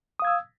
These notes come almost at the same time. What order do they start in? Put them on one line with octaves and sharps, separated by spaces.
D#6 F5 G#6 E6